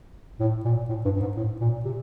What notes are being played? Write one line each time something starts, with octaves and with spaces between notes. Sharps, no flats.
A2
A#2
A2
G2
G2
G#2
A2
A#2
C3